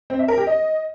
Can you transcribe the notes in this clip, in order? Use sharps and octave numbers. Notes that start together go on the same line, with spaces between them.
C4
E5
A#4
G4
D#5